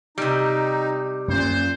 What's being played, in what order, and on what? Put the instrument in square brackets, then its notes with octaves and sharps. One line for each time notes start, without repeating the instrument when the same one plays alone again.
[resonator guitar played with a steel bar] C3 G3 [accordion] D#4
[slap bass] F#2 C#4 [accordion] A#2 [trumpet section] C5